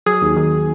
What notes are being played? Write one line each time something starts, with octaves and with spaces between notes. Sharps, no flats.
F#3 G#4
D#2
D#3